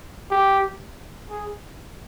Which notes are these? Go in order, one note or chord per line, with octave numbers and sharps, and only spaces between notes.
G4
G#4